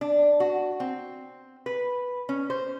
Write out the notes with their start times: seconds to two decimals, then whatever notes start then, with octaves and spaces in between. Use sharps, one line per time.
0.01 D4
0.40 F#4
0.80 C4
1.66 B4
2.29 C#4
2.50 C5